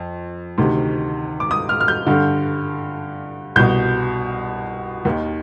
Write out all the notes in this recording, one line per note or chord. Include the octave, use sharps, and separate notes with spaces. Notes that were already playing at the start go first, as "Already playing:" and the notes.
Already playing: F2
D2 C3 D#3
D6
D#6
F6
F6
G6
G2 D3
C2 B2 G6
D#2 D#3